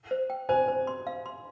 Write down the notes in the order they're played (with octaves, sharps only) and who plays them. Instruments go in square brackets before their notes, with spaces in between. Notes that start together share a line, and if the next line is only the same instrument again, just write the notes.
[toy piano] C5
G5
[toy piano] C5 [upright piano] G#5
[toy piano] C5
C6
F5
C6